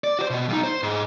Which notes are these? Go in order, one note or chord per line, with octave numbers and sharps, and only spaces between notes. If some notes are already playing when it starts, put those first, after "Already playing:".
D5
F#4 C5
B2
B1 D#4
C5
G#2